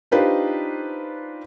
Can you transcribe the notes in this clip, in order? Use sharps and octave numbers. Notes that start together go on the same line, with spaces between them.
D4 D#4 F4 G4 B4 C5